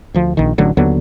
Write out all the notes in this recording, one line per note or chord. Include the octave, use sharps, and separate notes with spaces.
D2 F3
A#1 D#3
A1 D3 F#3 A3
D#2 D3 F#3 B3